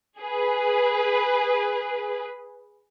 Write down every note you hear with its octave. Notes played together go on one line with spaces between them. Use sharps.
G#4 B4